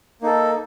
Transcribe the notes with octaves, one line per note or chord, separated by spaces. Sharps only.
A#3 D#4 A4